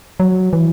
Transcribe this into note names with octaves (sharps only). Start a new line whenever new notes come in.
F#3
E3